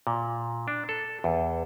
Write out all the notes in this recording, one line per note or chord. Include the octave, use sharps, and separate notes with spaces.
A#2
D4
A4
E2